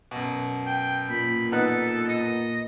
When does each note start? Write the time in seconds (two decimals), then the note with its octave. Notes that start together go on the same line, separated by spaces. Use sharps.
0.11 F#2 B2
0.66 G5
1.10 A#2 B5
1.52 B3 D#4 A4 F#6
2.08 D#5